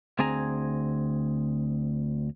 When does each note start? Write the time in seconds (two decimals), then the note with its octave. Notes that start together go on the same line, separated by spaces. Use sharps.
0.19 D2 C4 G#4 G#5 A#5